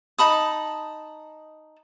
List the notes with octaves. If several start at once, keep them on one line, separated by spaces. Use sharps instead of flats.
D#4 A5 B5 D#6